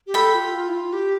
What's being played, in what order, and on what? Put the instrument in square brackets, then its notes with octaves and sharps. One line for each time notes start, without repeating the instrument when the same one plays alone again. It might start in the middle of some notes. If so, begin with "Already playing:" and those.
[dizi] G4
[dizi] A4 [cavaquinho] G5 B5
[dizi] F4
F4
E4
F4
G4